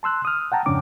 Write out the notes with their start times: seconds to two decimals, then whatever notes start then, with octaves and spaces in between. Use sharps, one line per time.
0.03 A5 C6 E6 F#6
0.25 D#6 F6
0.52 F#5 G5 A5 A#5
0.66 F2 G#2 C#3 C#4 D4 D6